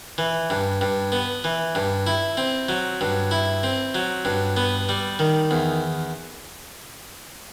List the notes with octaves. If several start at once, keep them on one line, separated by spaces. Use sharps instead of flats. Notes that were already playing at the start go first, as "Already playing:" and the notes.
E3
G2
G2
B3
E3
G2
E4
C4
F#3
G2
E4
C4
F#3
G2
B3
G3
D#3
E2